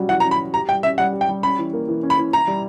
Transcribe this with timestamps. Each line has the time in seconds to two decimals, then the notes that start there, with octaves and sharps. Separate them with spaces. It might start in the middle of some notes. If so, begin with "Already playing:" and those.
Already playing: F#3 G3 C#4 F#4
0.09 E3 F#5
0.20 A#5
0.24 C#4
0.31 B5
0.39 F#4
0.53 G4 A#5
0.68 G3 G5
0.83 C#4 E5
0.98 G3 F#5
1.13 G4
1.21 G5
1.29 G3
1.43 C#4 B5
1.58 E3
1.73 A#3
1.88 E3
2.03 C#4
2.10 B5
2.18 E3
2.33 E4 A#5
2.48 G3